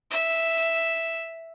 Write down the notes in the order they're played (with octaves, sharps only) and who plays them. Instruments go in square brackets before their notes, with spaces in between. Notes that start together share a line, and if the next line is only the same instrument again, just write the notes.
[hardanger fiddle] E5